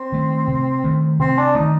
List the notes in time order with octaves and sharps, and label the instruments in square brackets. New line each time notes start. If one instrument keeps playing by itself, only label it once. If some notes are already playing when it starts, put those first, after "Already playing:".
Already playing: [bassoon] C4
[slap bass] D#3 A3
C3
D#3 A3
[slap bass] C3 [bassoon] C4
[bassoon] D4
[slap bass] D#3 A3 [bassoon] D#4